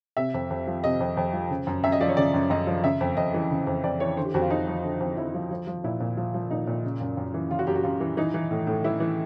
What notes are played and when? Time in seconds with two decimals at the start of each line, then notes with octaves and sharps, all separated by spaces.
0.17 C3 E5
0.34 F2
0.50 F2
0.67 F3
0.84 C3 D#5
1.00 F2
1.17 F2
1.33 F3
1.50 C#3
1.67 F#2
1.84 F#2 E5
1.92 D#5
2.01 F3 D5
2.09 C#5
2.17 C#3 D5
2.34 F#2
2.50 F#2 D#5
2.67 F3
2.84 C#3 E5
3.01 F2
3.17 F2 D#5
3.34 E3
3.51 C#3
3.67 F2
3.84 F2 D5
4.00 E3 C#5
4.17 D3 C5
4.25 G4
4.34 F2 F#4
4.42 F4
4.50 F2 D#4
4.67 F3
4.84 D3
5.00 F2
5.17 F2 E4
5.34 F3
5.51 F3
5.67 F3
5.84 A#2 E4
6.00 A#2
6.17 F3
6.34 F3
6.50 A#2 D#4
6.67 A#2
6.84 C#3
7.01 F#2
7.17 F#2
7.34 E3
7.50 C#3 F4
7.59 F#4
7.67 F#2 G4
7.76 F#4
7.83 F#2 F4
8.00 E3
8.17 E3 D#4
8.34 E3
8.51 A2
8.67 A2
8.84 E3 E4
9.00 E3